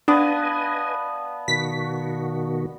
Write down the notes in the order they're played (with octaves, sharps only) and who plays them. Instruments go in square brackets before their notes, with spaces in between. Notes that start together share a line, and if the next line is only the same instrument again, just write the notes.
[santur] B3 [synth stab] D4 [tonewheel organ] B4 D#5 G#5 [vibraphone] D5 F5 A5
[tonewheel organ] B2 D#3 F#4 [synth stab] B6